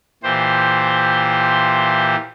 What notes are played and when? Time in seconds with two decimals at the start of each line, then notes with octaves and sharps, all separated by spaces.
0.23 A#2 E3 G4 C5